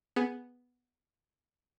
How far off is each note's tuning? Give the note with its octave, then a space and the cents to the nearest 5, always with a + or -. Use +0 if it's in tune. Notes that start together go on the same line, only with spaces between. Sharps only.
B3 +0 G#4 +0